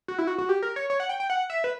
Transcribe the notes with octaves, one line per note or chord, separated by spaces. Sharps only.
F#4
E4
F#4
F#4
G4
A#4
C#5
C#5
F#5
G5
G5
F#5
E5
B4